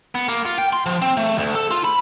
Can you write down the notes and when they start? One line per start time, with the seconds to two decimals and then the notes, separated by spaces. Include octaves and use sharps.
0.15 B3
0.29 A#3
0.45 F4
0.58 G5
0.73 C6
0.86 F3
1.02 C4
1.17 A3
1.38 D2
1.55 A4
1.71 F4
1.84 B5